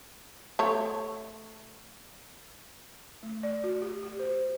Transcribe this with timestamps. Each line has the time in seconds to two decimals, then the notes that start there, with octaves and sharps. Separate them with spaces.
0.59 A3 C#5
3.23 A3
3.43 D5
3.64 F#4
3.82 G4
4.03 G4
4.19 C5